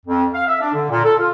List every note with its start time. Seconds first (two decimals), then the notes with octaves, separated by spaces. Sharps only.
0.06 F2
0.34 F5
0.47 E5
0.61 D4
0.74 D3
0.90 A#2
1.04 A4
1.19 F4